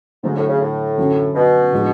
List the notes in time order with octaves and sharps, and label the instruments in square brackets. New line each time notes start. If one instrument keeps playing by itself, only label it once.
[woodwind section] G#2 [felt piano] D3 F#3 A3
[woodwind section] A2
C#3
A2
[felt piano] F#2 D3 F#3
[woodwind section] B2
[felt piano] A2 F3 G#3 D4 F4